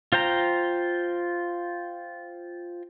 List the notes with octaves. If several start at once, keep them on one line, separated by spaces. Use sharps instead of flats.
F4 C5 G5 A#5